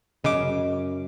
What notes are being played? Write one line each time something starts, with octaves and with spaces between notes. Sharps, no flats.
F#2 C#3 D#5 D6